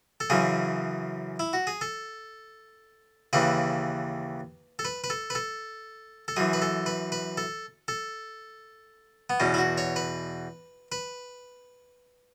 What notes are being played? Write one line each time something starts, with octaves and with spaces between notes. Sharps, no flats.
A4
F#2 C#3 E3 G#4
E4
F#4
G#4
A4
D#2 C#3 E3 B4
A4
B4
B4
A4
B4
A4
A4
F#2 E3 G#4
B4
A4
B4
B4
A4
A4
B3
E2 B2 C#4
E4
F#4
C#5
B4
B4